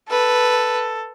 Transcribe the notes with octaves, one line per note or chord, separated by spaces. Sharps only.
A4 B4